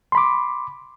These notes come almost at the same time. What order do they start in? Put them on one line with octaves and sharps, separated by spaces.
C6 B5 D6